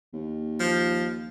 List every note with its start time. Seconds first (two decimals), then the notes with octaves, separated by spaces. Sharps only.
0.13 D#2
0.60 F3